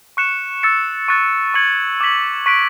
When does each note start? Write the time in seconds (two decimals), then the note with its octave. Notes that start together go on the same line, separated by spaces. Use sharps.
0.17 C#6 F#6 C#7 E7
0.63 E6 A6 C#7
1.08 C#6 F#6 A6
1.54 C#6 G#6 C#7 F#7
2.01 D6 G#6 B6 F#7
2.46 C#6 F#6 B6 D7